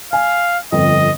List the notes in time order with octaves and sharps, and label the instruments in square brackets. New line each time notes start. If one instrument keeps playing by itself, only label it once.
[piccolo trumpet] F5 [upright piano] G#5
[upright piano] G1 F2 [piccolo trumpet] D#5